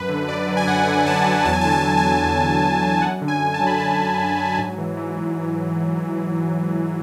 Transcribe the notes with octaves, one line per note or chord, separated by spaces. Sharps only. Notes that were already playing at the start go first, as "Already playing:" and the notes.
Already playing: F#2 B4
D3
F#2 D5
F#3
G#5
F#2 F#5
D3
F#2 A5
F#3
E2 A5
G#5
A5
D3
A5
E2
G#5
F#3
E2
D3
E2
F#3
F#2 F#5
D3
G#5
F#2
A5
F#3
B5
F#2 A5
D3
F#2
F#3
G#2
E3
E3
G#2